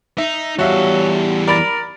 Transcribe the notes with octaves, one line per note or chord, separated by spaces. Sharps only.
D#4 E5
E2 F#3 G3 F#4 A4 E5 F5
A#4 D5 B5 A6